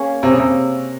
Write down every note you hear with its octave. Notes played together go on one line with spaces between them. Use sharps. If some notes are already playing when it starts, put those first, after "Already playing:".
Already playing: A#3 C#4 G#4
C3
C#3
C3